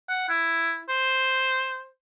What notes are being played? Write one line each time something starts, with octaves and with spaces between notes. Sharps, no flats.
F#5
E4
C5